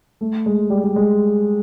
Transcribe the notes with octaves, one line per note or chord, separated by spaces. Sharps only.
A3
G#3
G3
G3
G#3